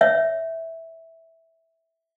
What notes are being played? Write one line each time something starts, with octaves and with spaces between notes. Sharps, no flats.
C#5 E5